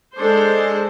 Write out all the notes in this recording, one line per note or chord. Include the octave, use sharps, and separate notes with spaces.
G#3 D4 A4 C5